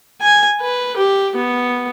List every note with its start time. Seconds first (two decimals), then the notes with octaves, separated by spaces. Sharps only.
0.22 G#5
0.61 B4
0.97 G4
1.36 B3